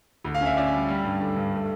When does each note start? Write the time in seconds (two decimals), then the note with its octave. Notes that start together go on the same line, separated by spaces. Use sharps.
0.24 D2
0.35 F5
0.41 C#4
0.46 E5
0.57 C#4 D5
0.73 G3
0.89 G3
1.05 G2
1.21 D3
1.36 G2
1.54 A3